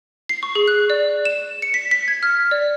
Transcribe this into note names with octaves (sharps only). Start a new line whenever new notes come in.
C7
C#6
G#4
F#6
D5
E7
C#7
B6
B6
G#6
F6
D5